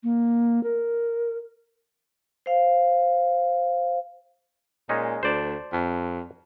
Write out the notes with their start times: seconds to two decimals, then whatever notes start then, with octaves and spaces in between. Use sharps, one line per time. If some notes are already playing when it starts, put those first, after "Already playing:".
0.04 A#3
0.63 A#4
2.46 C5 F5
4.89 A#2 G#3 C#4 D#4
5.23 D2 C5 D5 A5
5.73 F2